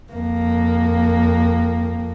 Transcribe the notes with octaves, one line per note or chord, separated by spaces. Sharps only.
F2 A#3